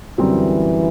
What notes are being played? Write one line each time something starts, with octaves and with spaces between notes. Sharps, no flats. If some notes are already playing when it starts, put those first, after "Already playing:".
F#2 D3 E3 G3 C4